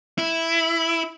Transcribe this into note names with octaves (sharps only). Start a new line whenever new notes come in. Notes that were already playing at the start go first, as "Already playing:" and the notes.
E4